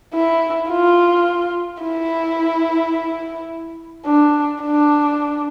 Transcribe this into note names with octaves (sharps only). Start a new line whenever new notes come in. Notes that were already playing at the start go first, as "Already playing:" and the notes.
E4
F4
E4
D4
D4